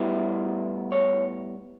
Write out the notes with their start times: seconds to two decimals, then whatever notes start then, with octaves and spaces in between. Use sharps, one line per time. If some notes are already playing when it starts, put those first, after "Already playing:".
Already playing: A2 G3 B3 E4
0.92 C#5